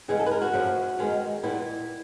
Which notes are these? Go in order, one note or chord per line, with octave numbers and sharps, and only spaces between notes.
C#3 E3 G#3 B3 G#4
A4
B4
A#4
F#4
F#2 C#3 F3 A3
F#2 D#3 G#3 B3
A#2 G3 B3 E4